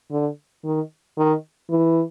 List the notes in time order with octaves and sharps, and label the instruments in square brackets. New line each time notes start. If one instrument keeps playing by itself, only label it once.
[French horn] D3
D#3
D#3
E3